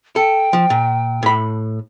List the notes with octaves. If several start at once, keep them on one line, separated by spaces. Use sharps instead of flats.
A4 G5
F3
A#2
A2 B5